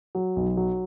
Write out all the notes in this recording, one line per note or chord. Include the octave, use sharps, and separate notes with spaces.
F#3
B1
F#3